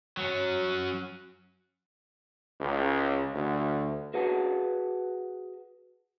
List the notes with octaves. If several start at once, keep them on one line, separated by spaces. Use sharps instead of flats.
F#3 C#4
C#2
D2
F#4 G#4 B4 F#5 G#5 A5